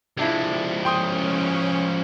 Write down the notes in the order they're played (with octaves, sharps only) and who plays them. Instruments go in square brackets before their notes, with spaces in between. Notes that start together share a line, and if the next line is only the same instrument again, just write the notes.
[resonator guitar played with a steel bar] C3 D4 E4 [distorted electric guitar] F3 G#3
[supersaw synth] C#4 [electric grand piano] G5 C6 D#6